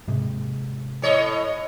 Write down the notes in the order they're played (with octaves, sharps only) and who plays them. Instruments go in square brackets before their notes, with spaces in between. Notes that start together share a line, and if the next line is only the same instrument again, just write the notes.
[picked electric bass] G#2 C3 G#3
[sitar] A2 C#5 D#5